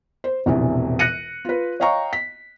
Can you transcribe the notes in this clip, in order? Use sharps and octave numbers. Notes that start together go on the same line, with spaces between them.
C5
E1 A#1 E2 C3 E3
F#6 A#6 C#7 D#7
F4 B4
C#5 D#5 F5 G5 A#5 C#6
B6